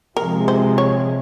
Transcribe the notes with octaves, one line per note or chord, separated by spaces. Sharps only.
C3 F3 G#3 A#4
C5
C#5